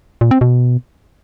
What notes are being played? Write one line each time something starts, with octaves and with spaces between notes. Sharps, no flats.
A#2
C4
B2